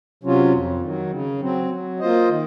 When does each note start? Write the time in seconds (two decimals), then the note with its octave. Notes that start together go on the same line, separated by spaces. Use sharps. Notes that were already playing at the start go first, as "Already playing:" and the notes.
0.24 C3 F#3 C#4 F4
0.52 F2
0.82 D#3 F#3
1.11 C#3
1.40 F#3 C4
1.71 F#3
2.00 A#3 F4 C5 D#5
2.29 D#3